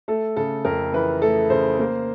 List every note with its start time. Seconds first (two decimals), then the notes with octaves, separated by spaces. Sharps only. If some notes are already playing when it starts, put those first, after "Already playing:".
0.08 A3 A4
0.37 C#3 A4
0.65 F2 A#4
0.93 E3 B4
1.22 A3 A4
1.50 C#3 C5
1.79 A#3